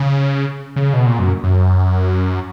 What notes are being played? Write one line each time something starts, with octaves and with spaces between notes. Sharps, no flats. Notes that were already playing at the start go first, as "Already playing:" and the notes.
Already playing: C#3
C#3
B2
A#2
F#2
F#2